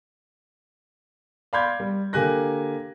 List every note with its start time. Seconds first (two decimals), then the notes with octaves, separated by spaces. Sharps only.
1.53 D5 F5 B5 C6 G6 G#6
1.80 G3
2.13 D3 A#3 G4 G#5 F#6 A#6